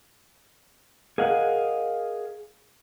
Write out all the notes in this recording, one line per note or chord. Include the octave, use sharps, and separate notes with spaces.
G#4 A#4 D#5 F5 F#5